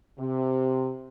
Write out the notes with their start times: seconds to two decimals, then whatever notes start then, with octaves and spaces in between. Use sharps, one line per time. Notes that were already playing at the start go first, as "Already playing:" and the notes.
0.19 C3